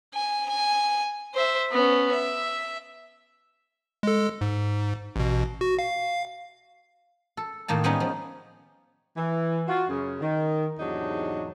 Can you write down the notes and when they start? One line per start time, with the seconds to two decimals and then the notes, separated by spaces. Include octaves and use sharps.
0.14 G#5
0.49 G#5
1.34 C5 E5
1.72 B3 C#4
2.12 E5
4.03 G#3 A4
4.41 G#2
5.16 A1 B2
5.61 F#4
5.79 F5
7.37 A4
7.68 A2 D#3 A#3 A5
7.84 G3 G#3 B3 C#4 D#4
8.00 F3
9.17 E3
9.68 F4 F#4
9.89 F#2 C#3
10.21 D#3
10.79 E2 G#2 C3 F#3 D4 D#4